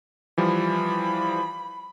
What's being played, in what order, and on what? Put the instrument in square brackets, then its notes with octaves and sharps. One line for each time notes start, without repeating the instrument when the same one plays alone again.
[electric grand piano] E3 F3 G3 [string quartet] B5